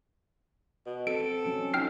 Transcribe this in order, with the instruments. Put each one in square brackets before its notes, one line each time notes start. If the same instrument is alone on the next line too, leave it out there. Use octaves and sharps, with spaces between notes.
[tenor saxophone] B2
[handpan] C4 [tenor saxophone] A4 [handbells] D7
[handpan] F#3 C#4
[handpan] D#4 F4 [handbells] G5 F6 C7